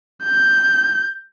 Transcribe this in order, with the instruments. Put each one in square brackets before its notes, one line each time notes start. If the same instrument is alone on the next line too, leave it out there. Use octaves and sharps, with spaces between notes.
[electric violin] G6